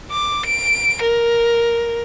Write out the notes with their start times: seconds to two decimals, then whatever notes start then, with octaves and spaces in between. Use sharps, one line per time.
0.11 D6
0.47 D7
1.03 A#4